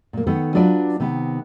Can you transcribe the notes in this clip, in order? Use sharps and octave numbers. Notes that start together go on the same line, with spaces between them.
A#2 A#3
D#3 B3 A4 F#5
F#3 D4 F4 B4 D5
C3 D#3 B3